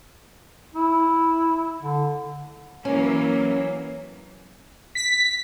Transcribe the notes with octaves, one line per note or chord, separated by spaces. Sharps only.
E4
D3
E3 F#3 A#3 C#4
B6